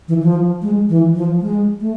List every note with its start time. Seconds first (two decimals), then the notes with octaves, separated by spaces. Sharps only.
0.08 E3
0.23 F3
0.62 G#3
0.89 E3
1.15 F3
1.41 G#3
1.80 A3